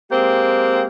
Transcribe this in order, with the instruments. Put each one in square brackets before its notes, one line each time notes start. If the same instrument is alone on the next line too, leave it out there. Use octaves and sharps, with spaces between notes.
[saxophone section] G#3 A#3 C4 G4